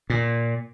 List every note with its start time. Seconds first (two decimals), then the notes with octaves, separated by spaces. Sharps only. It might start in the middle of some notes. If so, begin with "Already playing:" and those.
0.10 A#2